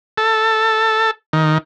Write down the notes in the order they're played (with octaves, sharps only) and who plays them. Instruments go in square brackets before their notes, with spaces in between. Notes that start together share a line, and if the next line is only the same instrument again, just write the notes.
[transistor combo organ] A4
D#3